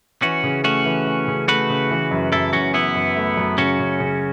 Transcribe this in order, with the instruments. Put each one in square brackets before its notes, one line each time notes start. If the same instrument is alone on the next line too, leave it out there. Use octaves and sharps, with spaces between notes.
[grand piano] E3 [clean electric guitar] C#4 F#4
[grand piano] C#3
[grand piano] A3 [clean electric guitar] C#4 F#4
[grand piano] E3
A3
C#3
[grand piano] A3 [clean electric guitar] F#4 B4
[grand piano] C#3
E3
F#2
[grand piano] F#2 [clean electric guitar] E4 A4
[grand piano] F#2 [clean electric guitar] C#4 F#4
[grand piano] E3 [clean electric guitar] B3 E4
[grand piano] F#2
A3
F#2
[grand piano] C#3 [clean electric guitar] C#4 F#4
[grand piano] C#3
C#3